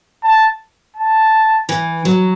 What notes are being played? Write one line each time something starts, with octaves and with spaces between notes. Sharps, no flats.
A5
A5
E3
F#3